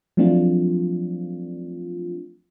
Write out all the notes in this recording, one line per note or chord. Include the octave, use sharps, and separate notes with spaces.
F3 F#3 A3 C4 D4 F4